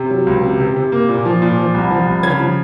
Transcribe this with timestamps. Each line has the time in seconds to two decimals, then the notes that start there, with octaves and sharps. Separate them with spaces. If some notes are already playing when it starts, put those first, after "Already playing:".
Already playing: C3
0.10 F#3
0.27 C#2
0.43 C3
0.60 C3
0.76 C3
0.92 A#3
1.09 A#2
1.25 F3
1.42 A#2
1.58 F3
1.74 C2
1.91 F3
2.07 C2
2.23 C#3 G#6
2.40 F3